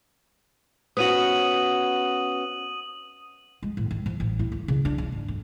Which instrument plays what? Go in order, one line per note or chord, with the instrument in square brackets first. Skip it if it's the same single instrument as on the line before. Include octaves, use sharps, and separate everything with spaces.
[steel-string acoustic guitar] B3 C#4 F#4 [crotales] D#6 D#7 F#7
[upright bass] G#3
A1
D#3
F3
A1
E4
D2
C#3
D4
C#2
G#1
F2